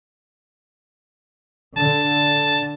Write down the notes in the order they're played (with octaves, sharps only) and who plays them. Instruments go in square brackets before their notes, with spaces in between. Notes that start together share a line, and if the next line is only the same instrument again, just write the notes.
[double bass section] D3 [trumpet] A5